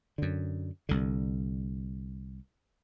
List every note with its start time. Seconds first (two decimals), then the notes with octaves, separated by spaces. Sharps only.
0.18 F#2 D3
0.89 C2 D3